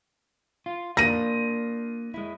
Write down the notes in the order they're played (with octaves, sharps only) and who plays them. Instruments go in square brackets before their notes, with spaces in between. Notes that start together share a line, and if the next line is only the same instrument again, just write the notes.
[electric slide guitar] F4
[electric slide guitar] A#3 D4 F4 [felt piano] A#6 D#7
[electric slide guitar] G#3 E4